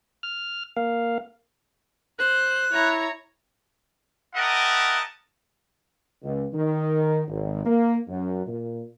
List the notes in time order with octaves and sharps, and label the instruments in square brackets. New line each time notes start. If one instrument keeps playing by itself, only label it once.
[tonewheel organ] F6
A#3 F5
[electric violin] C5 [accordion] F#6
[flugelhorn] E4 [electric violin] C#5 A#5
[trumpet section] E4 G4 A#4 D#5 F#5 A5
[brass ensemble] C#2
D#3
G#1
A#3
F#2
A#2